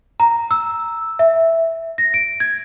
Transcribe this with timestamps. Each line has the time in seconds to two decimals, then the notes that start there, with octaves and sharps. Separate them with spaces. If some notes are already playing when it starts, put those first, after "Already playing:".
0.20 A#5
0.51 E6
1.19 E5
1.98 A#6
2.14 D7
2.40 G#6